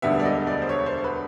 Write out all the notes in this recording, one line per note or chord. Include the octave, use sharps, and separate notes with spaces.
E1 D2 D3 G3 B3 E5
D5
D#5
D5
C5
C#5
C5
B4